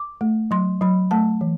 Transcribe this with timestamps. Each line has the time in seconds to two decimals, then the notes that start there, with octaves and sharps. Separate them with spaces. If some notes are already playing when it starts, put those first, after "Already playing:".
Already playing: D6
0.21 A3
0.51 F#3 C6
0.81 F#3 B5
1.11 A3 A5
1.41 E3